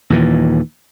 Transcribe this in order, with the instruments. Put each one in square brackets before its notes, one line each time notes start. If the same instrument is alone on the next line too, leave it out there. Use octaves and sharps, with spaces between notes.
[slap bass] D#2 A#2 E3